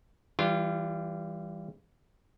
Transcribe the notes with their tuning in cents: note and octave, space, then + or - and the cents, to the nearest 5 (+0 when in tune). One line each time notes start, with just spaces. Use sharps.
E3 +0 G3 +0 F4 -30